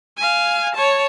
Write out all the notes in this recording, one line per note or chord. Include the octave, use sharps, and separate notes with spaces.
F5 G#5
C#5 A5